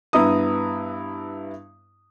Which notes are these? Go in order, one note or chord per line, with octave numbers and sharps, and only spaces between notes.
G2 B3 E4 A#5 D#6